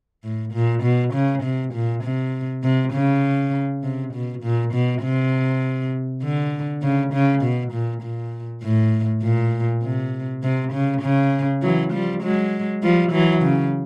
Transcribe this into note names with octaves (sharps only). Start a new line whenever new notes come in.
A2
A#2
B2
C#3
C3
A#2
C3
C3
C#3
C3
B2
A#2
B2
C3
D3
C#3
C#3
B2
A#2
A#2
A2
A#2
C3
C3
C#3
C#3
E3 F#3
F3 G3
F#3 G#3
F3 G3
E3 F#3
C#3